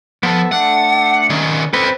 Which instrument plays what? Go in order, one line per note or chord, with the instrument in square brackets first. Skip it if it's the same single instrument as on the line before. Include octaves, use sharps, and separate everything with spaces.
[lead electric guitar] F3 [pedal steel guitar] B3 A4
[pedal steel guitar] A3 D4 [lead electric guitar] F#5
[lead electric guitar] D#3 C#4
[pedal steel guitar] C4 B4 [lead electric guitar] A4 C5